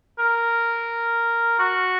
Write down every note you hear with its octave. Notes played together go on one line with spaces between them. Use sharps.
A#4
F#4